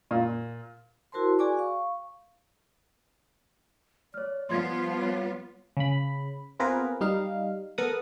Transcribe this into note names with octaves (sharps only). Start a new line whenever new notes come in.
A#2
E4 F#4 A#4 C5 A5 C6
F#4 G#4 D5 G#5 C#6 D6
F5 C#6
C#5 D5 F6
F3 G3 B3 F4 C6 G#6
C#5
C#3 B5
B3 C4 F4 G#4 A#4 B4
G3 D#4 F5
B3 A4 A#4 F#5 D#6